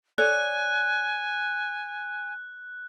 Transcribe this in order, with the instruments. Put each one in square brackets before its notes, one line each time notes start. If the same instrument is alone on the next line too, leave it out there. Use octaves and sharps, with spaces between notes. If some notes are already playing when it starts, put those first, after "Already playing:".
[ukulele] A4 C#5 D5 [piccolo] G#5 [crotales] F#6